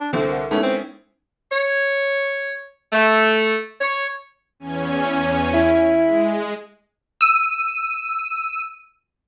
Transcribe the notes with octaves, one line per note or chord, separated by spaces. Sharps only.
D4
C2 D3 C4
A#4 F#5
G#3 A3 B3 C#4 D#4 E4 A4
C4
C#5
A3
C#5
E2 C#4 G#5
E4
G#3
E6 D#7